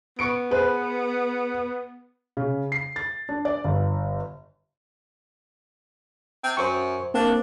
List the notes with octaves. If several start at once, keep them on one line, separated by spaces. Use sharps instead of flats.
B3 C#6 C#7 D7
G#4 B4 C5
C#3
C7
A6
D4
D5
G1
C4
F#2 C5 C#6
A#3 C4 D4